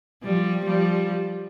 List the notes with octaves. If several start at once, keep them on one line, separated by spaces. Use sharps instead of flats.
F3 G3
F3 G3